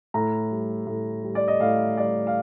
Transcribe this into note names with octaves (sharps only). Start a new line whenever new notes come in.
A2 A#5
G3
A2
G3
D5
D#5
A2 F5
G3 D5
F5